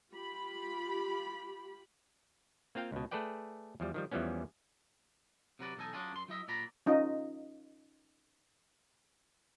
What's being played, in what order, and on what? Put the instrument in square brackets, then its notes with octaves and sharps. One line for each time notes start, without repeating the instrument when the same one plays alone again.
[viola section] F4 G4 B5
[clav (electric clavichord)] A#3 C4 F4 F5 G5
C#2 B2
A3 G#4 A4 B4 D5 G5
E2 F3 G3
D#3 F3 G3
E2 E3 F3 G3 B3 C#4
[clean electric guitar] C3 F#3 B4 D5
B1 E2 D#4 A4 G#5
F#3 G3 C#4 D4 F4 G#4
F#2 C6
F#3 E4 D#5 E5
A#2 F#3 D5 A#5 B5
[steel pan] C#4 D#4 F4 D#5